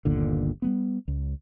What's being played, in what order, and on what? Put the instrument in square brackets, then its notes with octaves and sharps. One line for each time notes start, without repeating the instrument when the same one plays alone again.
[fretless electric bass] G1 D#2 A#2 D3
G3 A3 B3
C#2